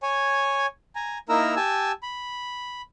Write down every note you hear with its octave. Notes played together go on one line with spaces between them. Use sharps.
C#5 G#5
G#5 A#5
A#3 D#4 E4 A#4 A#5 E6
G4 G#5 A5 E6
B5